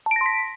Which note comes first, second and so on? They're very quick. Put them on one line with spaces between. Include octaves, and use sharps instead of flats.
A5 D7 A#6 C6 B6